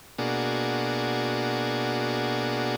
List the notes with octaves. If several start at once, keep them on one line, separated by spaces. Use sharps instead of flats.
B2 A#3 D4 F#4 G#4